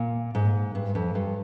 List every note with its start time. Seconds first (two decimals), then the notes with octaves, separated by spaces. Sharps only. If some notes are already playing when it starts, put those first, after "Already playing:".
Already playing: A#2
0.35 G#2
0.75 G2
0.95 F2
1.15 G2